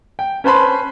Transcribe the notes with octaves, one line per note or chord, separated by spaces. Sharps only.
G5
C#4 B4 C5 A5 B5 C6